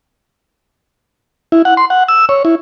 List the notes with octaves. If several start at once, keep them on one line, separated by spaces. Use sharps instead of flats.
E4
F#5
C6
F#5
E6
C#5
E4